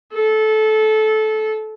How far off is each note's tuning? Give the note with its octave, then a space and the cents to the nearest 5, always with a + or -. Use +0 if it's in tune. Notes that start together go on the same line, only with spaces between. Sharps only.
A4 -20